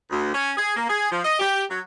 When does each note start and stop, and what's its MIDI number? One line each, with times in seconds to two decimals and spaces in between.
0.10 0.33 38
0.33 0.51 61
0.57 0.72 68
0.75 0.87 58
0.89 1.08 68
1.11 1.20 53
1.24 1.38 75
1.39 1.62 67
1.70 1.80 54